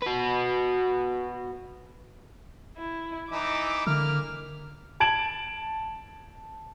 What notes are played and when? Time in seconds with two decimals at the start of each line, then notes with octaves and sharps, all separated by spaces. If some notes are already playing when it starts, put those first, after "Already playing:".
0.02 F#4 B4
2.77 E4
3.31 E3 D#4 E5 D6
3.87 D3 A#3 F6
5.00 A5 G#6 D7 F#7